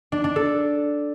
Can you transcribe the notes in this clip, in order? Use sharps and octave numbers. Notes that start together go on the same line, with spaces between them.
D4
D4
A4